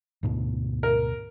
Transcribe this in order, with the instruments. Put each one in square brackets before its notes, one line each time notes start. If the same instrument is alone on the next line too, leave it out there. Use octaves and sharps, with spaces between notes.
[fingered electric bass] D2 G#2 B2
[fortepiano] A#4